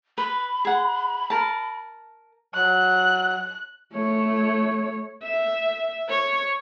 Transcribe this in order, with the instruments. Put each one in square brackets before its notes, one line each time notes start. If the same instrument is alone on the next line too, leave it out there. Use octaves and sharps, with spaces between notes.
[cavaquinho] B4 [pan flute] B5
[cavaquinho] G#4 F#5
A#4 A5
[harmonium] F#3 [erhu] F#6
[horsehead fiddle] A3 C#5
[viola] E5
C#5